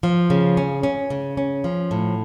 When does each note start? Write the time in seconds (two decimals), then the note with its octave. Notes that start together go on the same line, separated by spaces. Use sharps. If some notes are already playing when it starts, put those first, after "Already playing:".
0.03 F3
0.30 C#3
0.57 C#4
0.83 C#4
1.10 C#3
1.37 C#4
1.64 F3
1.91 A2